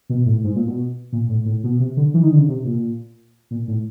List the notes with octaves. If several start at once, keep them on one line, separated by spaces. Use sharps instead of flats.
B2
A2
G#2
A#2
B2
A#2
A2
A2
B2
C3
D3
E3
D#3
D3
C#3
C3
A#2
A#2
A2